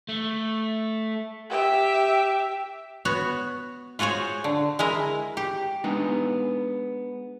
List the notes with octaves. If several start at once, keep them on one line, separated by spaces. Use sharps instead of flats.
A3
G4 E5
B3 F#4 C#5
F4 F#4 G#4 C5 C#5
D3
G#3 E4 A#4
G4
G#3 B3 D4 D#4